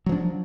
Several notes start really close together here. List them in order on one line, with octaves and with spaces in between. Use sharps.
F#3 F3 D4